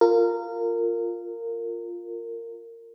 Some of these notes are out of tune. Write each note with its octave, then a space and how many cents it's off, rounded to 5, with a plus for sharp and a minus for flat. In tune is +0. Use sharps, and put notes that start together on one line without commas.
F4 +0 A#4 -20